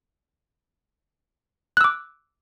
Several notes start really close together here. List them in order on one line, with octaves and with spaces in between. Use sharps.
F#6 E6 D6